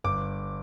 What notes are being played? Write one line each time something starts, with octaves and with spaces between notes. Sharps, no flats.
G1 D6